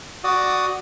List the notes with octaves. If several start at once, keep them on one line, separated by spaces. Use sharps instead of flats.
F#4 D5 D#6